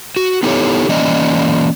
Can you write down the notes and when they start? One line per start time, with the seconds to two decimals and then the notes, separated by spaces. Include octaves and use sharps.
0.16 F#4
0.43 B3 D#4 E4 G4 A4 C#5
0.89 E3 A#3 C#4 D5 D#5